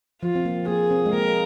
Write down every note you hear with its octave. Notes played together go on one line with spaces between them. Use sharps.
F3 F4
C4
A#3
A#3 G#4
C4
G#3
A#3 A#4